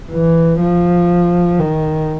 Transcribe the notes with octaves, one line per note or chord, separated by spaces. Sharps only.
E3
F3
D#3